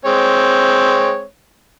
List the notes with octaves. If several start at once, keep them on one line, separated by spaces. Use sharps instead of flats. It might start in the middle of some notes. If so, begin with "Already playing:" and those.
G#3 C4 C#5